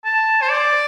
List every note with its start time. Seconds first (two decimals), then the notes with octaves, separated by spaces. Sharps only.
0.05 A5
0.42 C5
0.50 D5